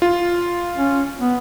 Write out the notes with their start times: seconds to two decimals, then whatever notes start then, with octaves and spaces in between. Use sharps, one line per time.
0.02 F4
0.77 C#4
1.20 B3